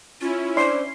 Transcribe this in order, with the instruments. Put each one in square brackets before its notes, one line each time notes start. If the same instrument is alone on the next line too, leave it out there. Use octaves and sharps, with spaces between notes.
[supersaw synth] C#4 E4 [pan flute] F4
[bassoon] D4 [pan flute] C5 [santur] C6